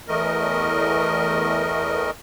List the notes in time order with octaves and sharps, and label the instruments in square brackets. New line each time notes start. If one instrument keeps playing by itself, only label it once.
[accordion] E2 E3 A3 A#4 D#5